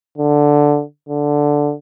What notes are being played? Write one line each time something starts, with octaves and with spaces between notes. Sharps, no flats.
D3
D3